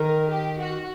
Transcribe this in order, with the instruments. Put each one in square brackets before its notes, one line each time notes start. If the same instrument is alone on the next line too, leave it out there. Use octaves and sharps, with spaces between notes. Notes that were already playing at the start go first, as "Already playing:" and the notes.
Already playing: [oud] D#3 [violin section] A#4
[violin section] G4
F#4